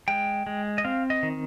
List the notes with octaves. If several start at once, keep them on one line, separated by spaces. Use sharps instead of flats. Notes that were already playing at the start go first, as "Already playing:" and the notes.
G#3 G5
G#3
D#5
C4 F5
D#5
D#3